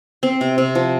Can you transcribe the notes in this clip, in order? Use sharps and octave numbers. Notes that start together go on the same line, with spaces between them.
C4
C3
C3
F3